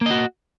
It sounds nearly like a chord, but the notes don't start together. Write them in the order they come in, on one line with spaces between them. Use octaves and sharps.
A#3 D#5 F#4